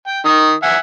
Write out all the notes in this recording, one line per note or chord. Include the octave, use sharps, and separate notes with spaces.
G5
D#3 D#6
E5 F#5 G#5